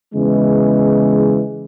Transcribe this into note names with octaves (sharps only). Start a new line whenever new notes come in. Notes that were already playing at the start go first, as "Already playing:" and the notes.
E2 C#3 E3 G#3